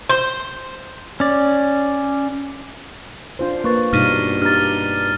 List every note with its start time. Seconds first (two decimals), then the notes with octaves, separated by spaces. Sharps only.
0.09 C5
1.20 C#4 D5
3.39 D4 F4 C5
3.64 A#3 B4 C#6 A6
3.93 G2 B2 D#4 F6 D#7
4.42 D4 D#4 G4 F6 A6